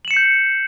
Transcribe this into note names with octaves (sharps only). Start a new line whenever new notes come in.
G6 C7 C#7 E7 F#7